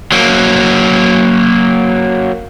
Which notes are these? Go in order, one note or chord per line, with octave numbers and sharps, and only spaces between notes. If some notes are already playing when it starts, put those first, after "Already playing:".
F#3 A#3